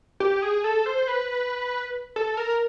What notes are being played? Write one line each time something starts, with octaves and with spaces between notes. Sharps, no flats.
G4
G#4
A4
C5
B4
A4
A#4